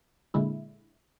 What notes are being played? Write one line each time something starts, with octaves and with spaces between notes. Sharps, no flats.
A#2 D3 G#3 E4